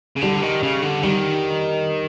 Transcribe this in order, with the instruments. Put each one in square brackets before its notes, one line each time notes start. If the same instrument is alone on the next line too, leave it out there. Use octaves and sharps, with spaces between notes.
[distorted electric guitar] C#3
[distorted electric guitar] D3 [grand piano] G3
[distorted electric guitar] D#3
C#3
D3
[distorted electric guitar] D#3 [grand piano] G3